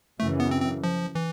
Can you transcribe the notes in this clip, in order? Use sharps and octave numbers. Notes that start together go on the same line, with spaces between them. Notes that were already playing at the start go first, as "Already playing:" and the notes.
F#2 C#3 E3 A3
B3
C4
C4
F3
E3